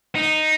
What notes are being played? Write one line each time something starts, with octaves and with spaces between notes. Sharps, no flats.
D#4